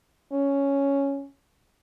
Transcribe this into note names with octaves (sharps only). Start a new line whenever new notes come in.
C#4